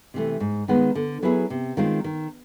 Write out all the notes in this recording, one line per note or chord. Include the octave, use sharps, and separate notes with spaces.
C3 E3 A3
G#2
D#3 G#3 B3
D3
F#3 B3 E4 G#4
C3
D#3 G#3 C4 F4
D#3